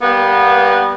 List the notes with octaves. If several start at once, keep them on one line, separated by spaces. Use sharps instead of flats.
G3 A#3 B3